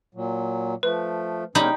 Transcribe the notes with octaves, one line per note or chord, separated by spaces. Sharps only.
A#2 F#3
F3 A3 B4
B2 G#3 C#4 D#4 G4 D5 B5 G6